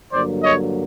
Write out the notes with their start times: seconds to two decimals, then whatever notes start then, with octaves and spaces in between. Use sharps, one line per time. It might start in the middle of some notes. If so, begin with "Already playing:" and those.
0.12 G2 D3 F#3 A#3 C5 D5
0.43 C#5 D#5